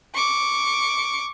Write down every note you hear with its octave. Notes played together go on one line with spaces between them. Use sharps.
C#6 D6